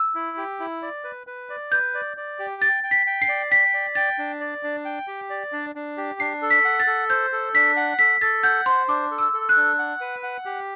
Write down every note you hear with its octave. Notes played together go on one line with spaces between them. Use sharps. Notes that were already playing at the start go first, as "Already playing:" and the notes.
Already playing: E6
E4
G4
E4
D5
B4
B4
D5
B4 G6
D5
D5
G4
G5 A6
G5
B6
G5
C7
D5
G5 B6
D5
G5 A6
D4
D5
D4
G5
G4
D5
D4
D4
G4
D4 C7
A4
B6
F#5
A6
A4
C5 G6
A4
D4 B6
F#5
A4 B6
A4 A6
F#5 G6
C5 C6
D4 D6
A4
E6
A4
F#6
D4
F#5
B4
F#5
G4